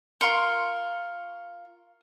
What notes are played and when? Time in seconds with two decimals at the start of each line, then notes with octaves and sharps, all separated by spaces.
0.21 F4 A#4 C6 C#6